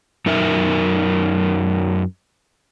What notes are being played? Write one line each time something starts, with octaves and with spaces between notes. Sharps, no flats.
F#2 D#4 A#4 E5